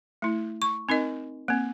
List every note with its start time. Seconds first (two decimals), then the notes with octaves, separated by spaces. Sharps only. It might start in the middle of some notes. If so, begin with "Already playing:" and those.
0.22 A3 E4
0.62 C#6
0.89 C4 D#4 A#4 D#5
1.48 A#3 C4